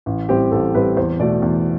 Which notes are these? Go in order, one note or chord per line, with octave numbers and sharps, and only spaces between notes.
A1
A2 G3 C4 G4
A1 A4
A2 G3 C4 B4
E2 C5
B2 A3 D5
E2